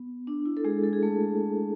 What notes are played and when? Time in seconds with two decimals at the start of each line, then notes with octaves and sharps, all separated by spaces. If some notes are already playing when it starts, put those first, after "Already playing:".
Already playing: B3
0.27 D4
0.46 E4
0.57 A4
0.64 G#3 G#4
0.83 A4
0.93 G#4
1.03 A3 A4